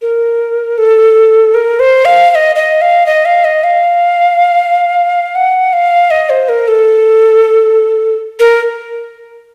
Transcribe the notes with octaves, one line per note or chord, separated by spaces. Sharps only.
A#4
A4
A#4
C5
F5
F5
D#5
D#5
F5
D#5
F5
D#5
F5
F#5
F5
D#5
C5
A#4
A4
A#4